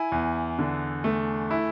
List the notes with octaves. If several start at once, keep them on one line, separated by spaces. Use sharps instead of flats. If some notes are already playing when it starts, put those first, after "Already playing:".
Already playing: E4 G#5
E2
D3
A3
E4